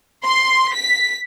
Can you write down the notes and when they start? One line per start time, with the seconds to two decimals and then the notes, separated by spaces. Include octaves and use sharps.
0.25 C6
0.74 B6